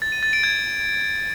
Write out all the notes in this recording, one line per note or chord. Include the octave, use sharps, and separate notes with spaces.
A6
D#7
A6
D7
G#6